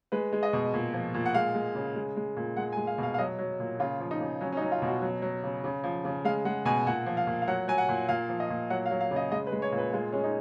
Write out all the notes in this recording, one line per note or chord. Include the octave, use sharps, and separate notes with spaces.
G#3 B4
G#3
D#5
B2
A#2
F3
A#2
F#5
G#3 F5
G#3
C#3
G#3
G#3
A#2
G#3 F#5
G#5
G#3
F5
B2 F5
F5
F#3 D#5
F#3
A#2
C#3 F4
F3
D#4
C#3
F#3 C#4
C#4
D#4
F#3
F4
B2
F#4
F#3
F#3
C#3
C#3
F3
C#3
G#3 F5
G#3 F#5
B2 G#5
A#2 F#5
F3
F5
A#2
F5
F#3 F#5
F#3 G#5
F#5
A#2
A#2 F5
F3
D#5
A#2
F#3 F#5
F5
F#3
F5
C#3
D#5
G#3 D#5
B4
G#3
C#5
A#2
B4
G#3 F4
G#3 C#4
D#4